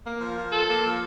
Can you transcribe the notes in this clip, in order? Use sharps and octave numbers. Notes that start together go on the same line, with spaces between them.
A#3
F3
F4
A4
A#3
F3